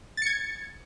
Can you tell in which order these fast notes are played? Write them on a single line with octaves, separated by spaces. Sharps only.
A6 C#7 G#6